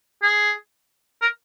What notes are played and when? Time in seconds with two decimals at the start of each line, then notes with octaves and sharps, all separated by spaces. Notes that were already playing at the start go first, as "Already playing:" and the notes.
0.23 G#4
1.21 A#4